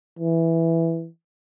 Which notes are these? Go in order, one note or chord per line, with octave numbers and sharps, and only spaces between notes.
E3